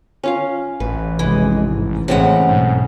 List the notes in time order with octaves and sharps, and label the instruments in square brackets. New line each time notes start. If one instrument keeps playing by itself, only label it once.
[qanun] C#4 F4 F5
[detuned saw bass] A1 [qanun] B4
[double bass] F1 G#3 [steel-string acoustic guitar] E3
[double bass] G#2
[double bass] A1 E3 [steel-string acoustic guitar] A2 C4 F#5 [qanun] C#3 G#3
[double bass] B1 [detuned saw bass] G#2